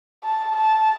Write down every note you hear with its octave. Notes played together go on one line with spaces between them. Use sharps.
A5
A5